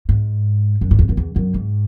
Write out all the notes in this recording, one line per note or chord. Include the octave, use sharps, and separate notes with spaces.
G#2
F#2
G#2
E2
F#2
E2
F#2
G#2